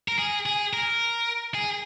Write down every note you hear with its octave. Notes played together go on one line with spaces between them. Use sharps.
A#4
G#4
G#4
A#4
G#4